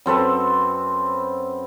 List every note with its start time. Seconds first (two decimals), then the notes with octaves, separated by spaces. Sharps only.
0.06 F#2 C4 A4 B4